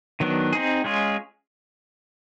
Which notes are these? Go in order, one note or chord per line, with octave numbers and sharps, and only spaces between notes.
D#3 F#3 B3 D4
C4 D#4 G#4
G#3 C#4 F4 G#4